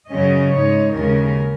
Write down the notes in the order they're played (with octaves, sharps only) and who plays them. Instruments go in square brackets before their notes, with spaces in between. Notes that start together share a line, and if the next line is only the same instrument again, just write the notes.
[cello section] F#2 C#3 F#3 C#4 D#5
G#2 G#3 D#4 C#5
D#2 C#3 G#3 C#4 A#4